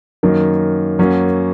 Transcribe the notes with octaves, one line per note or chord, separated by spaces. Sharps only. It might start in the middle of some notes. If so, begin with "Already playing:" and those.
F#2 D#3 A#3
F#2 F#3 A#3 C#4